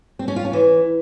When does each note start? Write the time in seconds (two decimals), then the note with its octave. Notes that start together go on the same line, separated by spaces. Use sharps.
0.19 C4
0.28 C#4
0.36 F4
0.45 C#4
0.53 E3